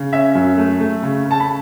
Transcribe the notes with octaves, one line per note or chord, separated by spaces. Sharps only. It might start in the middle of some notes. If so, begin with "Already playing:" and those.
Already playing: C#3
C#4 E5
F#2
A3
A3
C#3
C#3
A5
B5